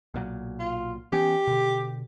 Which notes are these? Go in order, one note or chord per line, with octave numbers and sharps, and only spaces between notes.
B1 A#2 F#3
F4
E3 B3 C#4 G4
B2 D3